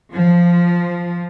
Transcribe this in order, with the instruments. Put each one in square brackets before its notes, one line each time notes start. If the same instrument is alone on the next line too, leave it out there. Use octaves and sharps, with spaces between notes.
[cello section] F3